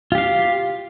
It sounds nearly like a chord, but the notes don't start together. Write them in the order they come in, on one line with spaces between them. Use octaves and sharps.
F4 G4 F5